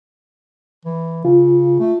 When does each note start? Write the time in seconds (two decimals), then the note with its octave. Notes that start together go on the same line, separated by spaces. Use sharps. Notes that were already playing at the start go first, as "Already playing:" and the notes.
0.85 E3
1.25 C#3 F4
1.80 A3